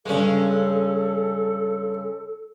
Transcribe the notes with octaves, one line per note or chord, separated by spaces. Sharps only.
G2 C#3 G#3 C#4 A4